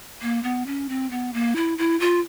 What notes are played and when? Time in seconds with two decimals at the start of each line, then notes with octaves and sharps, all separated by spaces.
0.22 A#3
0.43 B3
0.67 C#4
0.89 C4
1.11 B3
1.34 A#3
1.56 E4
1.78 E4
2.00 F4